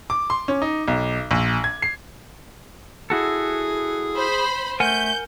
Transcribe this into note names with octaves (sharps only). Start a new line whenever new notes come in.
D6
C6
C#4
D#4
B1
A#1
G#6
C7
E4 F#4 G#4 A4
C5 B5
A3 A#4 F#5 G#5 G6